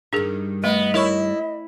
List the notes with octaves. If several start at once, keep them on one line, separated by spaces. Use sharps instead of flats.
G2 D#3 D4 G#4 A#4
A3 B3 D#5
E4 A#4 C#5 C#6